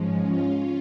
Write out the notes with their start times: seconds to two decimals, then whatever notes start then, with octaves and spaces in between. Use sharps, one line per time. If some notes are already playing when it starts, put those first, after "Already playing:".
Already playing: G#2 F3 G#3 C#4
0.26 F4